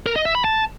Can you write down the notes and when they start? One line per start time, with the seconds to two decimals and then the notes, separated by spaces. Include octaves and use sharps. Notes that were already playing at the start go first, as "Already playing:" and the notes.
0.06 A#4
0.16 D#5
0.25 E5
0.35 B5
0.44 A5